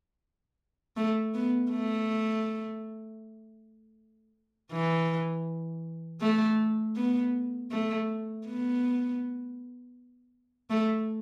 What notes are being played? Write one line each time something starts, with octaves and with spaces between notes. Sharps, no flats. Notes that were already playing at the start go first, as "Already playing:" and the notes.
A3
B3
A3
E3
A3
B3
A3
B3
A3